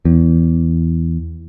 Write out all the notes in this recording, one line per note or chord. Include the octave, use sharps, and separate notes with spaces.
E2